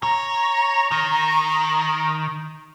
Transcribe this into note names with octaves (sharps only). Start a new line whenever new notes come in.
C#5 A#5
D#3